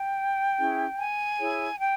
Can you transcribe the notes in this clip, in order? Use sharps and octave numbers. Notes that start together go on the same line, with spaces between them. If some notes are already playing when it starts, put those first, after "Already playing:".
Already playing: G5
C#4 E4 G#4
G#5
E4 G#4 C#5
G5